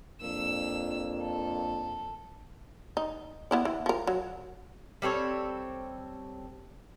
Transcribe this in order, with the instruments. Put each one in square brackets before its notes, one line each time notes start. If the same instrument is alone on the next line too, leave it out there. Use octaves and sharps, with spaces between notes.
[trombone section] F2 A#3 D4 [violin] E6
[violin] A4
[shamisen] D#4
B3 E4 D5
E3
F3 A#4
F#3
[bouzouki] G3 C4 A4 C#5